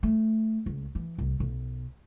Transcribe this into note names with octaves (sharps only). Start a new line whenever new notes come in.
A3
C#2
E3
C2
B1